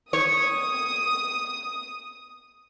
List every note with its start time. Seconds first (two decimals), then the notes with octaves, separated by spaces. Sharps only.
0.13 C#5 D#6